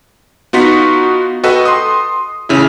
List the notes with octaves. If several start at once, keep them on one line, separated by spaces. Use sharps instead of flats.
B3 D#4 F4 F#4 C#6 B6
F#4 A4 B4 D#5 G5
C6 D#6
A1 C#3 E4